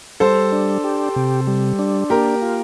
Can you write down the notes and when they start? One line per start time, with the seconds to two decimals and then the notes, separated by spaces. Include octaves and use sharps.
0.20 G3 A4 C5
0.52 D4
0.84 G4
1.16 C3
1.47 G3
1.79 D4
2.10 A#3 G4 A#4
2.42 F4